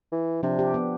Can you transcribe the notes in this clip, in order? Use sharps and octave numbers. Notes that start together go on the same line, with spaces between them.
E3
C3 F3 D4
G4
B3